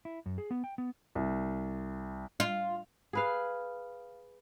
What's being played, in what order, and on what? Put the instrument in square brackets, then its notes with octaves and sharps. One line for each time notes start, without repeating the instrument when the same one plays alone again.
[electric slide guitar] E4
F#2
G#4
B3
G5
B3
[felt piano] C2
[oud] F4
[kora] G#4 B4 F5